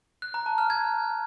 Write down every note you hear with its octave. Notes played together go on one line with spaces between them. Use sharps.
F#6
A#5
A5
F6
G#6